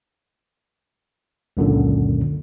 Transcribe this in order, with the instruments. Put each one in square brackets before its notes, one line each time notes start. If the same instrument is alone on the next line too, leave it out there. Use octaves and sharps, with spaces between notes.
[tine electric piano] C#2 F#2 A#2 D3